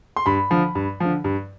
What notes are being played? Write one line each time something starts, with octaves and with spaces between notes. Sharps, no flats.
C6
G2 B5
D3 F3
G2
D3 F3
G2